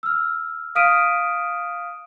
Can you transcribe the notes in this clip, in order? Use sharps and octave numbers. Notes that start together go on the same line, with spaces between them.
E6 F6
F5 D#6 F6 B6 D7 D#7